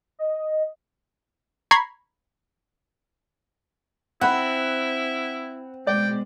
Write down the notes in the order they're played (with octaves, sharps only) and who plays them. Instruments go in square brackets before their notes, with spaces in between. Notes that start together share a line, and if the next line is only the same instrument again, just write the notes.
[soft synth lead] D#5
[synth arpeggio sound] A#5 B5 C#6 G#6 B6 C7
[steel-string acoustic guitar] C4 [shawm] E4 [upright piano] F#5 B5
[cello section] B2 G#3 [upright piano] D5 [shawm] G5